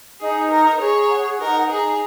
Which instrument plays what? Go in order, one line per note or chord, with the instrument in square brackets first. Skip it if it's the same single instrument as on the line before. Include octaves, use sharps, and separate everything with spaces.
[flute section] D#4 [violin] G#4
[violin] A#4 [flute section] A#5
[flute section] G#4 [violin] C#5
[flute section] F#5
[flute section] D#4 [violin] A#4
[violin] G#4 [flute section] A#5